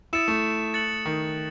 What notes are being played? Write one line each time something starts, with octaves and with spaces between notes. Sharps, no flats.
E4 D#6 A6 C#7 E7
A3
F#6 A6 C#7 F#7
D#3